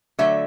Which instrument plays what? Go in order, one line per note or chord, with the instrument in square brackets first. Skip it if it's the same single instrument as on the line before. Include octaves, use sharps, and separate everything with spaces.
[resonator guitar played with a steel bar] D3 F#3 A3 E5